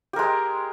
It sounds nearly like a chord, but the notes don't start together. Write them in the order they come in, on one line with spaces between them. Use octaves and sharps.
G4 A#4 G#3